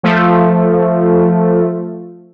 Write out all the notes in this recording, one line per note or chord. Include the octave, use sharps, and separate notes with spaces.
F3 A3